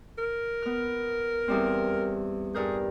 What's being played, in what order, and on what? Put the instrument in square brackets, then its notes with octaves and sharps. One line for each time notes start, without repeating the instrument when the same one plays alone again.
[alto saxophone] A#4
[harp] B3 F6
E2 G3 C4
[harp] G2 A#4 G6 [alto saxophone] G#4